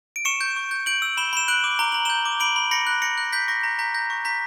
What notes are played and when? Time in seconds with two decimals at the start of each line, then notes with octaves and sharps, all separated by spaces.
0.16 D7
0.25 C#6 C#7 E7
0.41 G6
0.56 C#6
0.71 G6
0.86 G6 D7 F#7
1.02 E6
1.17 B5 E7 G7
1.33 B5 E7
1.48 F#6 D7 F#7
1.64 D6
1.79 A#5 G7
1.92 A#5 F#7
2.05 G6 E7 G7
2.26 D6
2.40 B5 D7 F#7
2.56 B5
2.71 B5 A#6 C#7
2.87 F#6
3.02 B5 A#6 C#7
3.18 F#6
3.33 G6 B6
3.48 C#6 A#6
3.63 A#5 A#6
3.79 A#5 G6 B6
3.94 G6 A#6
4.10 C#6
4.25 A#5 G6 B6